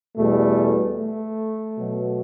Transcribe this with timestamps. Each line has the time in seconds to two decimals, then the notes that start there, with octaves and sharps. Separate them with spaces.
0.17 E2 B2 G3 A3
0.98 A3
1.78 B2 F#3